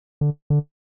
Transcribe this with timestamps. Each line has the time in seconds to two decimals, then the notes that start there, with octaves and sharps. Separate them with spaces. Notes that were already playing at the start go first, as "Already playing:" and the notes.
0.21 D3
0.50 D3